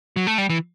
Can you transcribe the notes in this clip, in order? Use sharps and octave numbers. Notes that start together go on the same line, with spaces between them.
F#3
A3
G3
E3